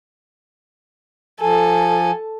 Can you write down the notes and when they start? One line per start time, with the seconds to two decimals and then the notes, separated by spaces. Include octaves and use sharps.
1.41 F3 A4 G#5